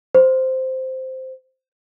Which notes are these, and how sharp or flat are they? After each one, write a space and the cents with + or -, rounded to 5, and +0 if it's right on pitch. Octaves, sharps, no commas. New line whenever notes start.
C5 -5